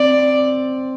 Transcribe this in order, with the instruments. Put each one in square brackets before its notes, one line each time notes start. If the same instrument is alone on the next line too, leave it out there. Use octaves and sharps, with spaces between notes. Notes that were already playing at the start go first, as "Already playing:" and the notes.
Already playing: [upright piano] C4 [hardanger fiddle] D5